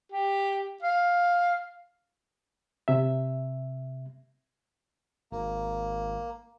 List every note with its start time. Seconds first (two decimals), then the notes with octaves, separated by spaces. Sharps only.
0.12 G4
0.82 F5
2.88 C3 E5
5.32 G#1 A#3